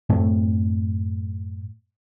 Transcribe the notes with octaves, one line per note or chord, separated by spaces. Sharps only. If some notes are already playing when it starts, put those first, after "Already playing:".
F#2 A2 A3 C4